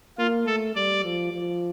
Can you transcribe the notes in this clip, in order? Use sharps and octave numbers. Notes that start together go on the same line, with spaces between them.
A#3 F4
A3 A4
G3 D5
F3
F3